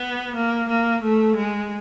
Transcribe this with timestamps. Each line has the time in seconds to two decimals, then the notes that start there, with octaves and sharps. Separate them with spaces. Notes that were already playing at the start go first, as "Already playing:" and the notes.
Already playing: B3
0.36 A#3
0.69 A#3
1.03 A3
1.36 G#3